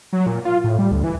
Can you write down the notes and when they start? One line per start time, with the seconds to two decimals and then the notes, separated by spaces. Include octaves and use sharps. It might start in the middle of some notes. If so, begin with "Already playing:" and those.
0.13 F#3
0.26 A#2
0.45 F4
0.64 A2
0.79 G3
0.91 D2
1.04 E3